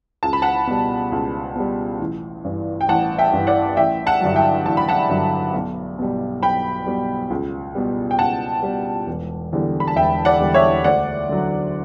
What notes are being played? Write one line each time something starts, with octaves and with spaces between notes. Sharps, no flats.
C#2 A5
B5
F#5 A5
B2 G3
C#2
B2 G3
A1
G2 E3
G5
A1 F#5 A5
E5 G5
G2 E3
D5 F#5
A1 E5 G5
F#5 A5
G2 D3 F#3
E5 G5
A1 A5
B5
F#5 A5
G2 D3 F#3
B1
B2 G3
B1 G5 B5
B2 G3
C#2
B2 G3
G5
C#2 F#5 A5
B2 G3
E1
E2 D3 G3
B5
A5
E1 E5 G5
D5 F#5
E2 D3 G3
C#5 E5
D2 D5 F#5
D3 F#3